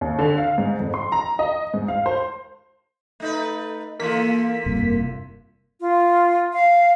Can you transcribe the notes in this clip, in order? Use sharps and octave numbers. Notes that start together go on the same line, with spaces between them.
D#2
D3
F5
G#2
F2
C6
A#5
D#5
G#2
F5
C5
A3 D#4 B4
D3 E3 A#3 F4 B6
F1 G2 C3
F4
F5